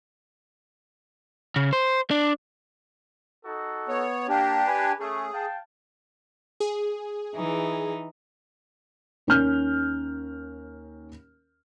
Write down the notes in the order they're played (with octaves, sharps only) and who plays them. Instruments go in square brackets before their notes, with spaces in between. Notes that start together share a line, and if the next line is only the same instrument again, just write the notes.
[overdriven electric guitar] C#3
C5
D4
[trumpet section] D#4 F#4 A4
[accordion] B3 C#5
[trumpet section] A#3 G5 [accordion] D4 G4
[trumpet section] B4 G#5
[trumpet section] A3 C#4 [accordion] G#4
[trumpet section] F5 G5 A5
[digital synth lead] G#4
[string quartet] E3 D#4
[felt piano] D#2 C#4 A#4 F6 G6